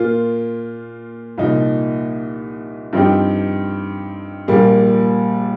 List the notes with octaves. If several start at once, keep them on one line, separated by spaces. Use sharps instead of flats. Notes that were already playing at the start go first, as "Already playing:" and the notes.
Already playing: A#2 A#3 F4
C2 A#2 F3 D#4
G2 F3 C4 D#4 G4
A#1 A#2 G3 A#3